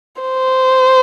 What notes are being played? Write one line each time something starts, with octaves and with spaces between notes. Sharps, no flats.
C5